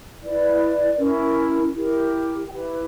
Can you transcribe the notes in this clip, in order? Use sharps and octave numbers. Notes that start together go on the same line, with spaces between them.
E4 B4 D5
C#4 E4 A#4
E4 G4 A#4
E4 G4 B4 G5